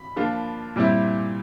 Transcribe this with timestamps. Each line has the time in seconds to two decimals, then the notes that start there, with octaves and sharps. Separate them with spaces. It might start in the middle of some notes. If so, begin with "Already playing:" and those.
Already playing: B5
0.16 F3 A#3 D4 F4
0.76 A#2 G3 C4 E4